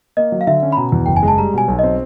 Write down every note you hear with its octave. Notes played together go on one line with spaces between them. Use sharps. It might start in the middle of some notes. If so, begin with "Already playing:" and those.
A#3 D#5
F#3
F5
D3 E5
C#4
B5
B2 A#5
E2
F#1 G5
G#5
G#3
A5
G3 A#5
B2 G#5
B1
C4 D#5